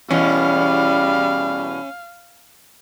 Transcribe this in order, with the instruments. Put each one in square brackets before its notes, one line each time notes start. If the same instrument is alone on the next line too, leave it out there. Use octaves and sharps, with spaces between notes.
[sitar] E2 B2 [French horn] G3 [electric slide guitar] C#4 [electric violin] F5